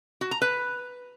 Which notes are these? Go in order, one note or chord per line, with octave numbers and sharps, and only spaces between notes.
F#4
A#5
B4